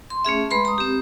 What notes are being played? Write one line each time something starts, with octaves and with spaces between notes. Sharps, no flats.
C6
A3 C#4 G#4 E5
G#3 B4 B5 C6
A#5 D#6
C4 G4